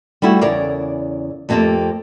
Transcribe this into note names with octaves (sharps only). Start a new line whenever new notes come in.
G3 A3 E4 F#4 G4
E2 C#3 E4 A#4 D5 F5
F2 A3 A#3 C4 G4 A5